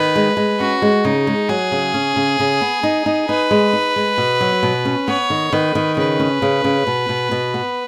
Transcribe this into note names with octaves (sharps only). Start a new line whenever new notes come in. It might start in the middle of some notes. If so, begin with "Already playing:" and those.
Already playing: D#3 B4
G#3
G#3
C#4 F#4
G#3
C#3 D#4
G#3
F#3 G#4
C#3
C#4
C#3
C#3
B3
D#4
D#4
D#4 B4
G#3
D#4
G#3
B2
F#3
B2
C#4
B3 C#5
D#3
D#3 B4
D#3
C#3 B4
C#4
C#3
C#3
B2
B2
B2
B3